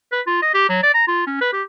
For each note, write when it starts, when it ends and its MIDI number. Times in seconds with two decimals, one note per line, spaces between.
0.12 0.21 71
0.27 0.38 65
0.42 0.51 75
0.54 0.66 67
0.69 0.82 54
0.83 0.94 74
0.94 1.07 82
1.08 1.27 65
1.27 1.36 61
1.41 1.49 71
1.53 1.63 67